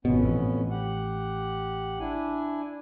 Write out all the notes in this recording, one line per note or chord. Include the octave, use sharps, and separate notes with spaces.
G#1 F2 B2 B3 C#4
A1
G4 F#5
D4 E4 G#5